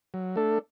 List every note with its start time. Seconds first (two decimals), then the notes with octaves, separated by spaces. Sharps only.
0.14 F#3
0.36 A3 D4 A4